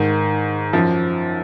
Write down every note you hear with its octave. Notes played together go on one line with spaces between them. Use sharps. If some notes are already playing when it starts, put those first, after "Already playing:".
Already playing: G#2 D#3
F#2 F3